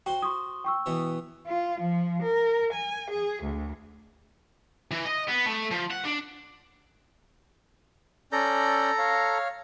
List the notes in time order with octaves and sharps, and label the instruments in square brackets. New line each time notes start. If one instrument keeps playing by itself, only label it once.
[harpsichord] F#4 C5 [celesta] G5
[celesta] C6 C#6 D#6
G5 C#6 E6
[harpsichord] B2 E3 B3
[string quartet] F4
F3
A#4
G#5
G#4
D2
[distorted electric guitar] E3
D#5
B3
A3
F3
F#5
D4
[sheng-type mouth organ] C#4 D5 G6 [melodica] A4 A#5
[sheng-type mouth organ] C#5 F5